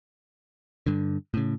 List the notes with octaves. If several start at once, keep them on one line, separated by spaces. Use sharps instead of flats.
G2 D3
A2 C#3